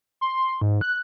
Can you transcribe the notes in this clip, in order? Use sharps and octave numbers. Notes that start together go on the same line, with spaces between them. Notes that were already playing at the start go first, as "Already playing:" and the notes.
C6
G#2
F#6